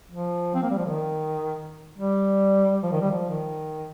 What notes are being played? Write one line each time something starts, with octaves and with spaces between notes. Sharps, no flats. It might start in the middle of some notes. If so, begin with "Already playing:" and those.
F3
C4
A#3
G3
F3
D#3
G3
F3
D#3
G3
F3
D#3